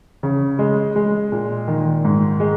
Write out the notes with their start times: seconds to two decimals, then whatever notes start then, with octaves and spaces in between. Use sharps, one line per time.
0.23 C#3
0.59 G#3
0.96 G#3
1.32 A#2
1.68 D#3
2.05 G#2
2.40 G#3